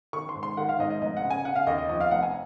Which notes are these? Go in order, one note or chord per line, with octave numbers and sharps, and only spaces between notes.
D#3 C#6
C6
G#2
C6
D#3 F#5
F5
G#2 D#5
D#5
F1 D#5
F#5
C#3
G#5
C#3 F#5
F5
D#2 D#5
D#5
F2 D#5
F5
F1 F#5
G#5